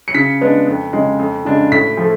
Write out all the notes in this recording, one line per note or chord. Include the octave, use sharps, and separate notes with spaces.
C#7
C#3 B6
G#3 B3 D4
F2
C#3 G#3
F2
C#3 G#3 D4
A2 B6
F3 A3